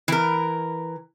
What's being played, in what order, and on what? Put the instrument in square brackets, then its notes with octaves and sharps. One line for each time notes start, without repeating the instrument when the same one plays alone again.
[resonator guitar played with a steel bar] E3 A#4